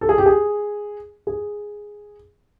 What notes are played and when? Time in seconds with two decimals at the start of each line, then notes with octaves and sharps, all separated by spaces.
0.01 A4
0.09 G#4
0.18 G4
0.26 G#4
1.27 G#4